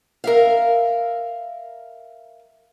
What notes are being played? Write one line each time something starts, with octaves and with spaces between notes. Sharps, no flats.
A#4 E5 F5